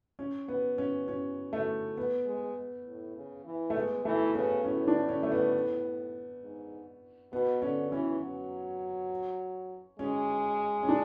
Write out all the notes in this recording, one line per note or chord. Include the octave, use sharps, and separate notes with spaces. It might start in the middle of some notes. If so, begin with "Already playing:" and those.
C#4
B3
C#4
C#4
A3
B3
G#3
A2
C#3
E3
A3
G#3 B3
E3 A3
C#3 B3
A2 C#4
D4
C#4
A3
B3
G#2
B2 B3
D3 C#4
E3 C#4
F#3
G#3 C#4
C#4
D4